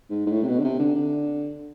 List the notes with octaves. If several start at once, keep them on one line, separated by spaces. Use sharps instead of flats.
G#2
G#2
A2
C3
B2
D3
C3
D3
D3